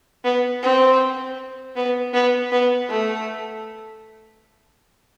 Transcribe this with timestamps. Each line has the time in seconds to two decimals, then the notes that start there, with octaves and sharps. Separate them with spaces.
0.24 B3
0.63 C4
1.76 B3
2.13 B3
2.52 B3
2.89 A3